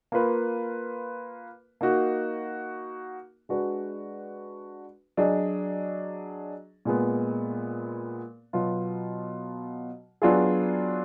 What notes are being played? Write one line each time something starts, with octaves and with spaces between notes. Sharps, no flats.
A#3 F4 B4
A#3 D#4 F#4
G#3 D4 F#4 B4
F#3 D4 G#4 D#5
A#2 G#3 B3
B2 F#3 B3 F4
F#3 B3 D4 F4 G#4